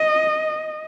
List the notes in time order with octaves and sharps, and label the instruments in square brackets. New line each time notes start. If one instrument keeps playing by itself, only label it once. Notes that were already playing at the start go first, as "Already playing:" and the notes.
Already playing: [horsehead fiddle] D#5